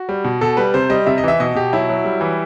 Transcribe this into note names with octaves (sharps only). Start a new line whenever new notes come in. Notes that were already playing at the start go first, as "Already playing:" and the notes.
Already playing: F#4
G3
B2
B2 A4
G3 B4
C3 C5
G3 D#5
C3 E5
D#5
E3 E5
B2 D#5
B2 G4
F#3 E4
F#3
G3
E3